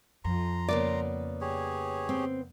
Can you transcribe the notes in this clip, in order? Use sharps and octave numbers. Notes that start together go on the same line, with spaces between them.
F2 A#5 C6
C#3 A#3 B3 D5
G4 G#4 C#5
C4